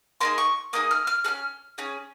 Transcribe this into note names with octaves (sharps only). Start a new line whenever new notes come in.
A#3 D#4 G#4 C6
C#6
A#3 D#4 G#4 D#6
F6
F6
C#4 G#4 F6
C#4 G#4